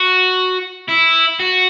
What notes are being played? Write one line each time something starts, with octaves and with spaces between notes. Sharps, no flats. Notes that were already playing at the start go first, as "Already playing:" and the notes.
Already playing: F#4
E4
F#4